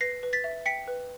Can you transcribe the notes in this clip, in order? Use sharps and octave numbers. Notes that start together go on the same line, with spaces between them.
B4 A#6 C7
B4
A6 B6
E5
G5 B6 C#7
B4